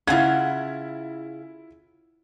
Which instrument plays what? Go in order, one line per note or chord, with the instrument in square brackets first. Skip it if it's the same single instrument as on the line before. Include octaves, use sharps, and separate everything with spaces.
[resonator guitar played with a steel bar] C#3 [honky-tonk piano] E4 G#6 [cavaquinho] F4 F#5